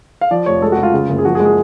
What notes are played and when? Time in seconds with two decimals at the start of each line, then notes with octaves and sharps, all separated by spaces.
0.21 F5
0.31 F3 D5
0.46 F1 C#5
0.62 G#3 A4
0.72 F#4
0.78 C#2
0.83 F4
0.94 C#3
1.09 F#1
1.18 G#4
1.25 F3 F#4
1.35 G#4
1.40 G#3
1.45 G#4